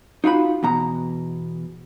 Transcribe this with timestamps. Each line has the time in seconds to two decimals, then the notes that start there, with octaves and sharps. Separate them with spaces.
0.24 D#4 F4 F#4 B5
0.63 E2 B2 A#5